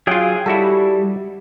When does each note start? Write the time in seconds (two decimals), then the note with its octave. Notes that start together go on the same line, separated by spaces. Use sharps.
0.07 F#3 F4 G#4 F5 G5
0.46 G3 E4 F#4 A4